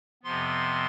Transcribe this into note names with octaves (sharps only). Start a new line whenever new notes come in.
F2 C3 F3 B3 C6